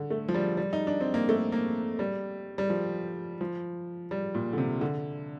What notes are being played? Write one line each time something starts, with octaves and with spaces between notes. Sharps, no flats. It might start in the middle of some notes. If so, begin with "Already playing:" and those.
Already playing: D3
A3
F3
G3
G3
D#4
D4
C4
A#3
A3
A#3
G3
G3
F3
F3
G3
A#2
D3
C3
D3